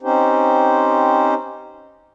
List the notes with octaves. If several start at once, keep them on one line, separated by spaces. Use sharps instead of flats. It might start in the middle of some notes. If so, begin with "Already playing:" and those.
C4 C#4 D#4 G4 C5